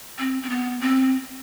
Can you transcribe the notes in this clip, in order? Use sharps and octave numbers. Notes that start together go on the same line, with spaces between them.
C4
C4
B3
C4